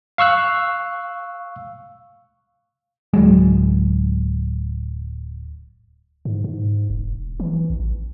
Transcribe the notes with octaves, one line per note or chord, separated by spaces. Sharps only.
F5 C#6 E6 F#6
D1 F#3 G#3
G#2
G#2
E1
E3
A1